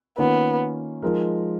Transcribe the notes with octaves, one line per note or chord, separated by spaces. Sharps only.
D#3 A#3 B3 C#4 F4
F3 G#3 D#4 A#4